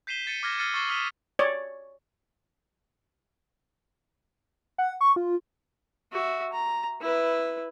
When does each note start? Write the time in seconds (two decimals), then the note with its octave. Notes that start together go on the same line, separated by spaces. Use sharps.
0.07 G6 B6 C7 D#7 E7 G7
0.27 A6 C#7 D#7
0.43 D6 F6 G#6 A#6
0.58 E6 F6 A6 C7 C#7 D#7
0.74 C#6 E6 A6 C7 G7
0.89 D#6 F6 A6 B6 C7 D#7
1.39 C#5 D5
4.78 F#5
5.01 C#6
5.16 F4
6.13 F#4 E5
6.52 A#5
7.01 E4 B4